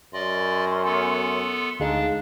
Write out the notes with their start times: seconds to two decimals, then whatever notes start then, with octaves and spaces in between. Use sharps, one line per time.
0.13 F#2 D5 D#5 C6
0.84 B3 A4
1.80 D2 G#3 D4 D#4 F5